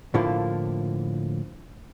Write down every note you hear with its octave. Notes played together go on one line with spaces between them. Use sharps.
A2 D3 F3 A#3 E4 F4